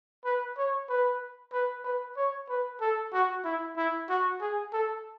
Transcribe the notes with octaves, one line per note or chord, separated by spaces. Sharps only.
B4
C#5
B4
B4
B4
C#5
B4
A4
F#4
E4
E4
F#4
G#4
A4